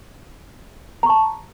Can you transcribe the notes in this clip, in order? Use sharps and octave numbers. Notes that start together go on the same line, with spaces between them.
A5 A#5 C#6